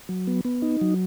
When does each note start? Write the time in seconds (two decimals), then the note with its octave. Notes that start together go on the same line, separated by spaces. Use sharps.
0.09 F#3
0.27 B3
0.45 B3
0.62 D#4
0.81 F#3